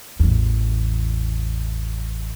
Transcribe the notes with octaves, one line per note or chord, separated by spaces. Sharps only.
A1 E2